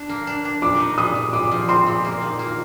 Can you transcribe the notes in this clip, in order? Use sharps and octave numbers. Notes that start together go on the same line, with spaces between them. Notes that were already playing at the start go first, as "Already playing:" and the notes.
Already playing: D4
A#3
D4
D4
A#2 D6
D#4
A#2 D#6
A#2
A#2 D6
F3
C4 C6
A#2
A#3
D#3
A#3